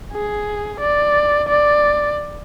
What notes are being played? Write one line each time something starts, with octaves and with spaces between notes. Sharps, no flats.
G#4
D5
D5